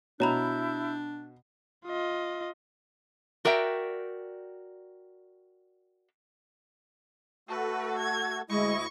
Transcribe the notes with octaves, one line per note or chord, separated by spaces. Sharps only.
B2 D4 E4 C#5 A#5 B5 G6
F4 D#5
F#4 A#4 D5 E5 G5
A3 F#4 A4 B4
G#6
D2 G#3 E4 D#5 C#6